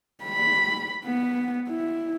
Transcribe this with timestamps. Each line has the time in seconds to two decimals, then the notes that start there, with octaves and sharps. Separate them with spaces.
0.24 B5
1.05 B3
1.69 E4